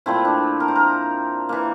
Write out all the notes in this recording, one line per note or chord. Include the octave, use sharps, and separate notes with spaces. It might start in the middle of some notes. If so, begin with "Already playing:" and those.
A#2 F3 A3 C4 E4
D4
A#4
C5
A#4
E3 A#3